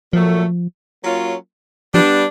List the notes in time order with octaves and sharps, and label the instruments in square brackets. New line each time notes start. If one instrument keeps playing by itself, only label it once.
[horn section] A#2 F#3 A3 [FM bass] F3
[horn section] F#3 A#3 C#4 F4
[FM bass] F3 [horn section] G3 B3 D4